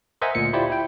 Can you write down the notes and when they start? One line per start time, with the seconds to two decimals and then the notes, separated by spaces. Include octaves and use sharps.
0.22 A#4 C5 D#5 E5 F#5 G#5
0.35 D2 A#2 C#7
0.53 E4 F4 G4 C5 D5
0.70 E4 G5